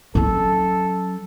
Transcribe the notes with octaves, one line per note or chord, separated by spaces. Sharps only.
F#3 C#4 A4